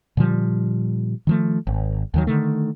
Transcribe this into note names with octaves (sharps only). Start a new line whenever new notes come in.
A#2 D3 F3 G3
D#3 F3 A3
G#1
D#2 D#3 F#3
D3 D#3 A3